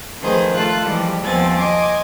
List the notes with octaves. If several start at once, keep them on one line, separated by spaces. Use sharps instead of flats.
D#3 F3 A3 G#4 B4 C5
A3 F4 A4 F#6
E3 F3 G3 G#3
D#2 F3 B3 C4 G#5 A6
D#5 G#5 C6 D6